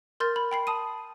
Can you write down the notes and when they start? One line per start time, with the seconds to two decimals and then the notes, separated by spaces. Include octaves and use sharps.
0.20 A#4 C6 F6 G6 A6
0.36 B5
0.51 G5 B5 C7
0.67 A5 D#6 D#7